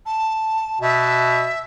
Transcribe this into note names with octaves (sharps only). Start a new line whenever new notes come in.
A5
B2 E5